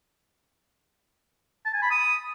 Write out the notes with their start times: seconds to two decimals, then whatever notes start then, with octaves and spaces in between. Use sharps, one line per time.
1.65 A5
1.74 G#5
1.82 B5
1.91 D#6